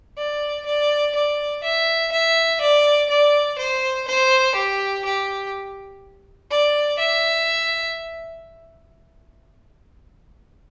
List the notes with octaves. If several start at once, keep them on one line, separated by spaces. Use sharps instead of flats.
D5
D5
D5
E5
E5
D5
D5
C5
C5
G4
G4
D5
E5